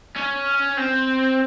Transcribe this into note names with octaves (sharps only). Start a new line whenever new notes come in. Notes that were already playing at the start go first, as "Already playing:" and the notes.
C#4
C4